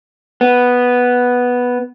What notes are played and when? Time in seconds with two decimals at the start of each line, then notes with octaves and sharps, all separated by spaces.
0.41 B3